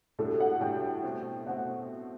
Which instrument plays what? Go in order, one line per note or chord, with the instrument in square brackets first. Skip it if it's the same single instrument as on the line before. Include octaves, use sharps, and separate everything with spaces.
[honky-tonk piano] A2 G3 D4 F#4 [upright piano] A4
[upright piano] F#5
[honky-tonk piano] A2 G3 D4 F#4 [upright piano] G5
[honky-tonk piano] B2 A3 C4
[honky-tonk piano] B2 A3 C4 [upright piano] F#5